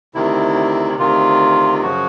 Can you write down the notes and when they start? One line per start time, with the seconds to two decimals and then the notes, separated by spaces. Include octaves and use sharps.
0.15 D2 C3 D#3 E4
0.99 D2 C3 D#3 F4
1.82 F#2 C#3 F3 F#4